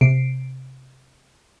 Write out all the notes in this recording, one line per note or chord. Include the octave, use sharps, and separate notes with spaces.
C3 C7 D7